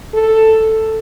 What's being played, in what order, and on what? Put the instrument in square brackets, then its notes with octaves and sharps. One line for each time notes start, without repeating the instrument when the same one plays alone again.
[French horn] A4